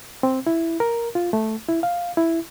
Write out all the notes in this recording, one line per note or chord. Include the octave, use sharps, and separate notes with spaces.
C4
E4
A#4
F4
A3
E4
F5
E4